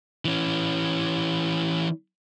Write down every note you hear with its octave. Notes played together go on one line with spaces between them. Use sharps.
E3 C#4